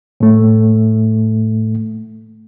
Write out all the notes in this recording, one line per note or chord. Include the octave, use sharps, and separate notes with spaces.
A2 A3